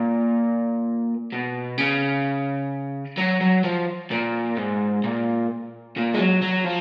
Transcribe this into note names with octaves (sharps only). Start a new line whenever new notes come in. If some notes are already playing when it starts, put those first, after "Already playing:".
Already playing: A#2
B2
C#3
F#3
F#3
F3
A#2
G#2
A#2
A#2
G#3
F#3
F#3
F3